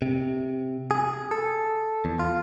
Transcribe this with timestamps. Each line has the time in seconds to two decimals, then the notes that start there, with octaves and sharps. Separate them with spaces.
0.02 C3
0.91 G#4
1.31 A4
2.05 E2
2.19 F4